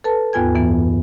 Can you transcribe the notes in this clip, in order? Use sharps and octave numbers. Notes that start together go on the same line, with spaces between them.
A4 B4 A5
D#2 G#2 B3 F4 G#5 G#6
F#2 E3 B3